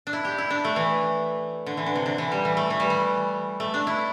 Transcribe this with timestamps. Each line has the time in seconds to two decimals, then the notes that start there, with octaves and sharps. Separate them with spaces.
0.07 D4
0.13 E4
0.25 G4
0.38 E4
0.50 D4
0.64 A3
0.76 E3
1.66 D3
1.77 E3
1.86 D3
1.95 C3
2.06 D3
2.18 E3
2.32 G3
2.45 E3
2.57 A3
2.70 E3
2.80 G3
2.90 E3
3.60 A3
3.74 D4
3.87 E4